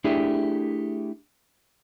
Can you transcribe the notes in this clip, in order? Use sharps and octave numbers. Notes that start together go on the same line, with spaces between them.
A3 D4 E4 G4 G#4 E5